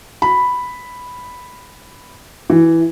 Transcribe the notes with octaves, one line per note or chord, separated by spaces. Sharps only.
B5
E3